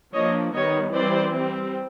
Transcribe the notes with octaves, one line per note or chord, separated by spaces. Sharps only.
F3 A#3 D4 C#5 D#5
D#3 G3 B3 C#5 D#5
E3 G3 C4 C5 D5
G3 C4